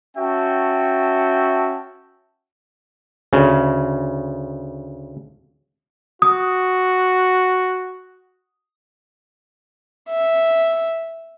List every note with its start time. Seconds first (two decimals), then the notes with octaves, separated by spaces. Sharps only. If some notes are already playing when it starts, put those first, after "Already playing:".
0.17 C#4 F#4 E5 G5 A5
3.33 D2 C#3
6.22 F#4 D#6
10.10 E5